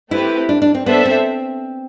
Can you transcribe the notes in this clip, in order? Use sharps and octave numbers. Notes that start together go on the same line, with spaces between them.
A3 C4 E4 G4 B4
D4
D4
C4
B3 D4 A4 C5 E5
C4